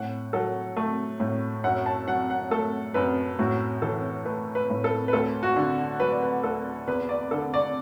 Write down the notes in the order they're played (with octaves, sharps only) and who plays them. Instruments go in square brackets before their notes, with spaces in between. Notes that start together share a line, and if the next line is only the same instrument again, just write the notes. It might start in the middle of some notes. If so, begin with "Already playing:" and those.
Already playing: [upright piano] A2 F#5
F#3 A4
A3
A2
F#2 F#5
A5
F#3 F#5
F#5
A3 A4
F#2 B4
A2 F#4
E3 A4
A3 B4
B4
A2
A4
B4
D2 A4
F#4
D3
F#3 B4
D5
B4
D2 A4
E2 B4
D5
D3 A4
D5